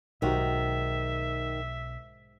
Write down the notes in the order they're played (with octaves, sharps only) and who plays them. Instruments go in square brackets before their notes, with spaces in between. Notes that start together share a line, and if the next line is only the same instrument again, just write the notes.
[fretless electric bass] B1 [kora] G#2 F#4 G4 [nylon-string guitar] D#3 [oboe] E5